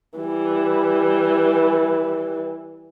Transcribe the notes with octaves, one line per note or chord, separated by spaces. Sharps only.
E3 G3